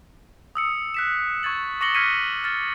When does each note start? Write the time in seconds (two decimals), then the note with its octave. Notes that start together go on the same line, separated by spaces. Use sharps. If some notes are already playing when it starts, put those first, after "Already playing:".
0.55 D#6 E6 C#7
0.94 F#6 B6 E7
1.43 C#6 G#6 A6 F#7
1.81 C#6 D6 A#6 C#7 F#7 G7
1.95 F6 F#6 G#6 B6 C#7 D#7
2.44 F6 A6